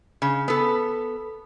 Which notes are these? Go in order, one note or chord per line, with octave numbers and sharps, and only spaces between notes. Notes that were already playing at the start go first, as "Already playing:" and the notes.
C#3
B3 A4